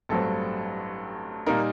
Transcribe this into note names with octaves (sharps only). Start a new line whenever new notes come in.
A1 G2 F#3 C4 A4
A#2 G3 A#3 D#4 A#4